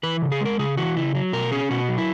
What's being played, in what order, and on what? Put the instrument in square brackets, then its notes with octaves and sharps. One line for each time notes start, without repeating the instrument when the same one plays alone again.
[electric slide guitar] E3 B4
C#3
G#4
G#3 A#4
C#3 G#4
E3 F#4
C#3 E4
F#3
B2 A#4
C#4 G#4
B2 F#4
F#3
E4